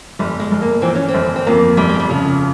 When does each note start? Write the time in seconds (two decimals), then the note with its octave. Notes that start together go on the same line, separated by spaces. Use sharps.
0.19 G1 G3
0.40 G#3
0.51 G1
0.62 A#3
0.82 E3 C4
0.95 C#4
1.08 C4
1.14 G1
1.36 C4
1.47 F2 A#3
1.77 G1 G3
1.89 G#3
2.00 G3
2.09 C#3 F3